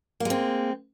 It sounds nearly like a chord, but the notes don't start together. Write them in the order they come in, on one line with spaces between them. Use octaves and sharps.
A#3 G#3 C4